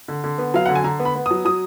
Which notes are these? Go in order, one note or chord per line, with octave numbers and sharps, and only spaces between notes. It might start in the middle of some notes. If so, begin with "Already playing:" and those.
D3
D3
B3
F#3 F5
D3 F#5
G#5
D3 A#5
B3
B5
B3
D#6
F#3
F#3 D#6